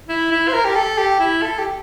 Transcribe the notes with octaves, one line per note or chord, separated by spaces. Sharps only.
E4
E4
C5
A#4
G4
A4
G4
E4
A4
G4